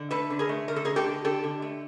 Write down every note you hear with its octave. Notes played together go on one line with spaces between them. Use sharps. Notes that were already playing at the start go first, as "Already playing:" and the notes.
Already playing: D3
A3 A4 B4
D3
G#4 A#4
A3
D3 A#4
A4
D3 G#4 A#4
G4 A4
D3
D3 G4 A4
D3
A3